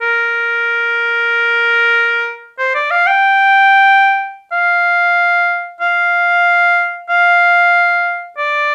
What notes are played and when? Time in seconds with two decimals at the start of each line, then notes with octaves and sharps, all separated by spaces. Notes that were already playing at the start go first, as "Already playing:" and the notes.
0.02 A#4
2.58 C5
2.75 D5
2.91 F5
3.07 G5
4.52 F5
5.80 F5
7.09 F5
8.38 D5